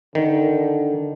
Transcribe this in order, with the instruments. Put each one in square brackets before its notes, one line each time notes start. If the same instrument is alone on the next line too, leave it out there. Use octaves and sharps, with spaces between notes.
[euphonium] D3 [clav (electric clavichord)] D#3